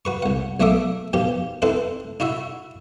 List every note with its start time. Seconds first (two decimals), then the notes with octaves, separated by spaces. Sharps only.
0.05 F#4 B4 C#6
0.22 C2 F#5
0.60 B1 A3 A#3 D#5 E5 D6
1.13 B2 D#3 F3 G4
1.62 C4 D#4 E4 A4 B4 C5
2.20 D#4 E4 F#4 E5